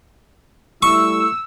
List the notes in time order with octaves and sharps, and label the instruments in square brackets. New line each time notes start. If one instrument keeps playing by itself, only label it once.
[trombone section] G3 A3 E4 [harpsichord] C#6 [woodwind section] E6